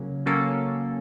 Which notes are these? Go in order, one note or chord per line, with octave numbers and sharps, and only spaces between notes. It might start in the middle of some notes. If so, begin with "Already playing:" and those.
Already playing: C#3 F#3 A#3 C#4
F#3 A#3 C#4 A4